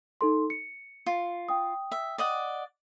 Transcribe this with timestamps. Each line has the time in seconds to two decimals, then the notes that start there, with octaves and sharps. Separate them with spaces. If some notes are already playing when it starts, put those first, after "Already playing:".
0.21 D#4 A4 C6
0.50 C#7
1.06 F4
1.49 G5 D#6
1.92 E5
2.18 D5 D#5 F#5